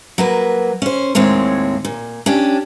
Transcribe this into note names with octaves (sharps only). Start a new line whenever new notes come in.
F#3 A#3 B4
C#4 C5
D#2 A2 G#3 C4 C#5
A#2
C#4 D4 G4